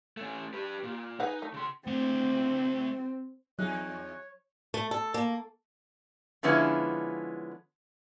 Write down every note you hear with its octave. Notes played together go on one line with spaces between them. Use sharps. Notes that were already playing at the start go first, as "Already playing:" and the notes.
A3 C#4
G4 B4
A#2
D#4 G#4 B4 F#5
A3
C#3 C6
A3 C4 F#5
E2 F#3 D#4 G#4 C#5 F#6
A3
A4
A#3
D3 F3 G#3 B3 C#4 E4